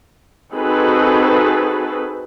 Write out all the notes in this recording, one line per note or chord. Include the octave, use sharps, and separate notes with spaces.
C4 D#4 F#4 G#4 A4 B4